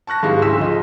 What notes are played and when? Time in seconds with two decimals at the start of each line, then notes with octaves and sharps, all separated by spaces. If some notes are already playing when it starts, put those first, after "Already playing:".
0.07 A5 C#6 F#6 A#6
0.23 G#2 E3 G#3 G4 F5
0.42 D2 C#3 C6 E6 B6 E7
0.59 F3 D#5